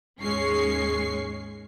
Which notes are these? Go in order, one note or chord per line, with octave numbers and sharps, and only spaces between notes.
D#2 G#2 G#3 C#4 C#6 C7